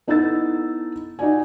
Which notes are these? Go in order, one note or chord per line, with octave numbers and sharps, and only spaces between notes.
B3 D#4 E4 A4 E6 A6
D#4 F#4 D5 G#5